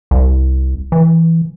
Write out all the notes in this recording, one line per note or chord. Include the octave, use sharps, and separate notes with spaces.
C2
E3